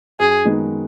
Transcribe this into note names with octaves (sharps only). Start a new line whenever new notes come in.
F#2 G#4
D#3 G#3 B3 D#4